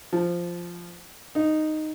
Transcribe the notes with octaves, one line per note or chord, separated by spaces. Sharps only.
F3
D#4